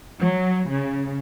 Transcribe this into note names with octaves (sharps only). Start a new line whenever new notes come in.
F#3
C#3